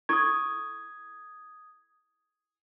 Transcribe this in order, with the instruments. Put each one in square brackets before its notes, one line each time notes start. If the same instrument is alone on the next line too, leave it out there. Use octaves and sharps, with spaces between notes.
[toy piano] E4 A4 C#6 [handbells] D#6 G#6